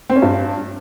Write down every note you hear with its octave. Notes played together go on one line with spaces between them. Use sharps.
C4
C#4
G2